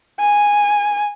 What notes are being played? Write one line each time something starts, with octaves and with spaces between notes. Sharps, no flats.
G#5